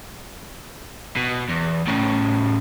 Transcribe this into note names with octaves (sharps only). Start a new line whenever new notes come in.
B2
E2
A2 C#3